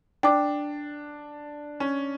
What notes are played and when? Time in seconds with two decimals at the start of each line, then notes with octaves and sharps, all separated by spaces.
0.23 D4 D5 G5 D6
1.80 C#4